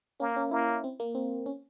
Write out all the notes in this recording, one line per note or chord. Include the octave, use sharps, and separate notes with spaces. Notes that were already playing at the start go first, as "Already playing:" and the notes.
A#3 C#4
C#4
A#3 E4
C4
A#3
C4
C#4